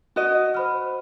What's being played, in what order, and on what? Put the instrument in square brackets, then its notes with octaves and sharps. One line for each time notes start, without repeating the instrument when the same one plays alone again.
[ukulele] F#4 D#5
[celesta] C5 B5 F6